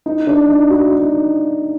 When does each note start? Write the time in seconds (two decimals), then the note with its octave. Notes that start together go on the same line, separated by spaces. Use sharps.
0.06 D#4
0.27 D4
0.49 D#4
0.70 F#4
0.91 D#4